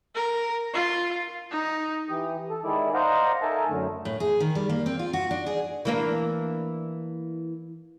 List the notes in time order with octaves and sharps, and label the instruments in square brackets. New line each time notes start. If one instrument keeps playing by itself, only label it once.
[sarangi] A#4
F4
[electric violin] D#4
[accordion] E3 G4 D#6
A4
D#3 G#3 E4 D5
C5 D5 D#5 F5 F#5 A#5
D#4 A4 A#4 E5 G#5 A5
F#2 D3 A3
[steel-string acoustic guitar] A2
G#4
D#3
G3
A#3
C4
F4
F#4
D4
G#4
[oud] E3 A#3 D4